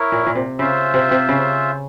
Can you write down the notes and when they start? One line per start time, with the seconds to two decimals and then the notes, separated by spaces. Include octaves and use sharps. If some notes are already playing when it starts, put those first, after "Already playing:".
Already playing: E4 A#4 C#5
0.12 A#2
0.27 A#2
0.35 C3
0.58 C#3 F4 C5 E5
0.94 C3
1.11 C3
1.29 C#3